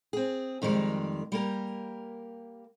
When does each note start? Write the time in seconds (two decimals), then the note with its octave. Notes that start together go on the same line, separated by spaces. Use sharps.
0.13 C4 G#4
0.62 F2 D#3 G3 G#3 A#4
1.32 G3 A#3 A#4